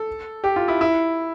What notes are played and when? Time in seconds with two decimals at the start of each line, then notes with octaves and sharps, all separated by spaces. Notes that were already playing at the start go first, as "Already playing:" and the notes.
Already playing: A4
0.44 G4
0.56 F4
0.68 E4
0.81 E4